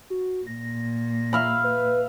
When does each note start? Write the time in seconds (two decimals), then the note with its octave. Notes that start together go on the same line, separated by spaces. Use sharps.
0.10 F#4
0.47 A#2 A#6
1.33 E5 F5 B5
1.64 B4